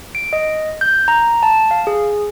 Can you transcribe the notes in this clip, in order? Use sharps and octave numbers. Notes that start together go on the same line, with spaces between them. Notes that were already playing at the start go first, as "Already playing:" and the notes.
D7
D#5
G6
A#5
A5
F5
G#4